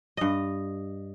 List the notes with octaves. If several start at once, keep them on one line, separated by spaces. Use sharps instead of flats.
G2 D#5